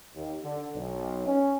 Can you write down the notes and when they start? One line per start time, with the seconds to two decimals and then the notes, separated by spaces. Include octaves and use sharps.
0.15 D#2
0.44 D3
0.74 B1
1.27 C#4